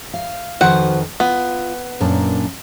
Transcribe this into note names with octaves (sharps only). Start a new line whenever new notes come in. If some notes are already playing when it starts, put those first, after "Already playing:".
F5
F2 D#3 F#4 B4 C5 F#5
B3 F4
F#2 A#2 D4